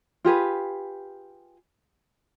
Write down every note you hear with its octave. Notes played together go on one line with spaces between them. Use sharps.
F4 G4 G#4 B4